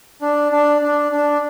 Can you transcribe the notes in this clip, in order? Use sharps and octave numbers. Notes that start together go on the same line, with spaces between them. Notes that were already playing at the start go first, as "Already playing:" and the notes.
D4
D4
D4
D4